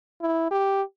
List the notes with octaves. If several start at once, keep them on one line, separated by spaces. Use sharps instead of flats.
E4
G4